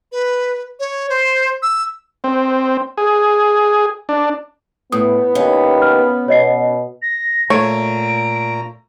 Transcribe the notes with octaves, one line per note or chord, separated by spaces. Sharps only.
B4
C#5
C5
E6
C4
G#4
D4
A2 B3 D#6
D#2 C#4 F5
F6
B2 C#5 D#5 C7
A#6
A#2 A3 C#5 A#5 D7